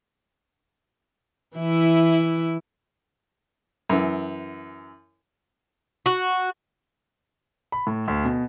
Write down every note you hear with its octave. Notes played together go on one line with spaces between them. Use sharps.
E3 E4
F#2 E3
F#4
B5
A2
D2
B2